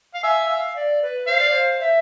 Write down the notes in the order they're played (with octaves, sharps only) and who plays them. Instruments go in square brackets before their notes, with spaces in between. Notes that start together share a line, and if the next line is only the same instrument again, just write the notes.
[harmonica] F5
[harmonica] E5 [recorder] G#5
[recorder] F5
D5
B4
[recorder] C5 [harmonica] F5
[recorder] D5
C5
E5